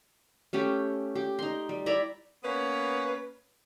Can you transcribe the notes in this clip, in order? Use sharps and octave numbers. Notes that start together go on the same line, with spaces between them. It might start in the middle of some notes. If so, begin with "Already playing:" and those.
A3 C#4 G4
G4
D#4 C6
G3
E4 D5 A#5 B5
A#3 B3 C#4 B4